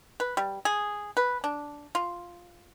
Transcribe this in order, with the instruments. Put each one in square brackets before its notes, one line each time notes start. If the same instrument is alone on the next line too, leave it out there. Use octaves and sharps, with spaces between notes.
[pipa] B4
G3
G#4
B4
D4
F4